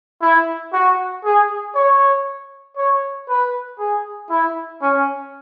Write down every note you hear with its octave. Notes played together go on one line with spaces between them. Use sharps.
E4
F#4
G#4
C#5
C#5
B4
G#4
E4
C#4